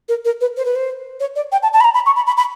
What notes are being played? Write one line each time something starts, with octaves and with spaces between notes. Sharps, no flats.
A#4
A#4
B4
C5
B4
C5
C#5
D5
G5
A5
A5
B5
A#5
B5
C#6
B5
B5
B5